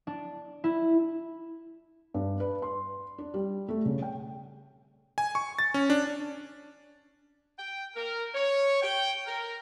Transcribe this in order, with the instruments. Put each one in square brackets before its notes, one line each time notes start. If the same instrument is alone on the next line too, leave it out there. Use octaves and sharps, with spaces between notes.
[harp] D4
E4
[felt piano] G2
B4
C6
D4
G3
A3
C#3
G5
[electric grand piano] G#5
C#6
A6
C#4
D4
[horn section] G5
A#4
C#5
G5
A#4